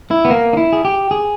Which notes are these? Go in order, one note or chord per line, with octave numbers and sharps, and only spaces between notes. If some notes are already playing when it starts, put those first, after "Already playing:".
E4
B3
A#3
D#4
E4
G#4
G4
G#4